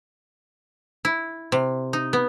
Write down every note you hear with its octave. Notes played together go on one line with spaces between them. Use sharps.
E4
C3
D#4
B3